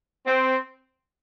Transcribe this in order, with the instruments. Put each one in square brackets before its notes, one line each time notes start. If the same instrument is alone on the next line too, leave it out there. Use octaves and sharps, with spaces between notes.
[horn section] C4